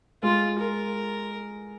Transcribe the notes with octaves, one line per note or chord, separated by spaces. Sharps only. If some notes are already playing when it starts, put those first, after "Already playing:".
G#3 F4
A#4